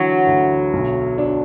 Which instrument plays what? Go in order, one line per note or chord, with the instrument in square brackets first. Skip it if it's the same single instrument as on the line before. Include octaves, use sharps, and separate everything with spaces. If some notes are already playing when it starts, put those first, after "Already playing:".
Already playing: [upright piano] D3 E3 [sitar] F#3
[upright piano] D2
B1
D4